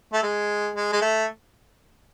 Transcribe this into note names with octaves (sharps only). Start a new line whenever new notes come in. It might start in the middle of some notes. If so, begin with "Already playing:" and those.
A3
G#3
G#3
G#3
A3